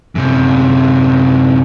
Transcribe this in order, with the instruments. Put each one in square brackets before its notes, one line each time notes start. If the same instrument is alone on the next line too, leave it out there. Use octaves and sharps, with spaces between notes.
[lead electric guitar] F#2 C3